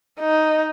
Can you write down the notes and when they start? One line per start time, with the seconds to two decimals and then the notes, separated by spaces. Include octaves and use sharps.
0.20 D#4